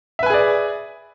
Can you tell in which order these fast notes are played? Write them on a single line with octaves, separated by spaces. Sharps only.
E5 B4 G#5 G#4 D5